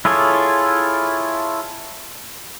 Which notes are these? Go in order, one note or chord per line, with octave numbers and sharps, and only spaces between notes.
E4 F4 G#4 A4 C#5